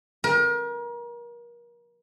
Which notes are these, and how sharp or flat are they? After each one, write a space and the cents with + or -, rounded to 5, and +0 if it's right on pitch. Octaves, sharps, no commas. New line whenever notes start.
A#4 +35